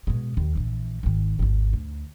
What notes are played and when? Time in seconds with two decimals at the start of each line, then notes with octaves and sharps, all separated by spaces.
0.07 B2 G#3
0.37 D#2
0.55 A#1 E3
1.03 G#1 D#3
1.39 G#1 D#2
1.73 D2